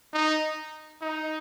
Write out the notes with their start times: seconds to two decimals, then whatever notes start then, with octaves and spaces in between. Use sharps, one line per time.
0.14 D#4
1.02 D#4